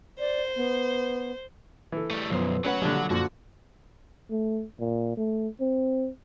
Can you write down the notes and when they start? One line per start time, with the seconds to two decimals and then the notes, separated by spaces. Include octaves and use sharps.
0.20 C5 D5
0.56 B3
1.92 E3 A4
2.10 G3 A3
2.30 B1 F#2 F3 B3 C5
2.65 F#3 A3 C#4 B4 F#5
2.82 A#1 D3 G3 D5 A5
3.10 F#2 A#2 D3 F3 D4 F#4
4.31 A3
4.80 A#2
5.17 A3
5.61 C4